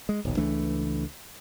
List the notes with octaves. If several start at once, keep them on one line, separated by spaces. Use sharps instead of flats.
G#3
D#1 B1
C#2 E3 A3 D4